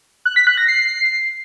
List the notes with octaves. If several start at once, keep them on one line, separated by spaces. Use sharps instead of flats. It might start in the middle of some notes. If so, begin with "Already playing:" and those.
F#6
B6
F#6
A#6
C7